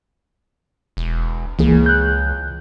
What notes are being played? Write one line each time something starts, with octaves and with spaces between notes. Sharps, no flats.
E1
C#2 E3 A#3 G#4
F#6 G6